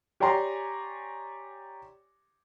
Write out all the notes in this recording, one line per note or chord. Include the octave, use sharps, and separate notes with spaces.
G4 C#5 D5 G#5 A#5 C6